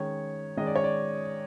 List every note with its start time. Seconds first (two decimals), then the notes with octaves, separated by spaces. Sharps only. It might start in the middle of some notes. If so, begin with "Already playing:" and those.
Already playing: D#3 G#3 C#4 C#5
0.57 D#3 G#3 C#4 D#5
0.67 D5
0.76 C#5
0.84 D5